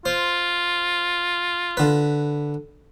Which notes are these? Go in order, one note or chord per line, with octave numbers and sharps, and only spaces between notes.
F4 C5
D3 B4